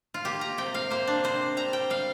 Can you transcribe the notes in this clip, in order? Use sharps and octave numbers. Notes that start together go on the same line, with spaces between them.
F4
A#3 G4
A#5
C3 G5
F5
A#3 C5
D4
C3 C5
G3 A#5
G5
G3 F5